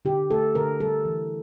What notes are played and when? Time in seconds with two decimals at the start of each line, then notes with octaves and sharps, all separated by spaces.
0.05 D3 G4
0.31 A3 A4
0.55 D3 A#4
0.80 G3 A4
1.05 E3